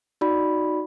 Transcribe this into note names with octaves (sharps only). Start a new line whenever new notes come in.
D#4 F#4 D5 B5